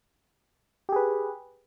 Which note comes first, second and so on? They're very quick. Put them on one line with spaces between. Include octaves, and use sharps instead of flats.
G4 G#4 B4